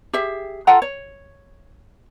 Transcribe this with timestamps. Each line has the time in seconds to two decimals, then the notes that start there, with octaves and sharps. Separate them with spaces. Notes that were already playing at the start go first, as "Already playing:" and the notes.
0.13 G4 G#4 E5
0.67 F4 A4 F#5 A#5
0.82 C#5